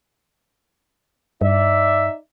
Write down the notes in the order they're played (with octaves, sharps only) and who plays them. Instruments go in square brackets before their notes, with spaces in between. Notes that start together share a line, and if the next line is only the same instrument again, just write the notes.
[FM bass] G2 [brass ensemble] D#4 D5 E5